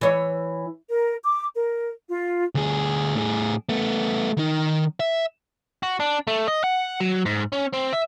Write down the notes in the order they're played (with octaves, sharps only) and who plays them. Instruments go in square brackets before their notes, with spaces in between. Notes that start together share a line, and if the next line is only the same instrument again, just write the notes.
[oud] E3 C#5
[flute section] A#4
D6
A#4
F4
[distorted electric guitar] D2 G#4
A2 G#4
A3 B3
D#3 D#4
E5
[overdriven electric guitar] F#4
D4
A3
D#5
F#5
F#3
G#2
C#4
C4
E5